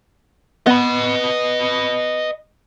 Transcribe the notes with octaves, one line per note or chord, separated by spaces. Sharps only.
B3 D#5 B5